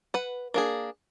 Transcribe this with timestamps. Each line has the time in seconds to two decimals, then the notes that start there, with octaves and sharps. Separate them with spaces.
0.14 B4 F#5
0.54 A#3 D4 G#4